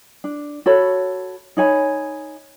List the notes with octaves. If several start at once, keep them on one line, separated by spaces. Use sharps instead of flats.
D4
F#4 A4 C#5 B5
D#4 C#5 G#5 B5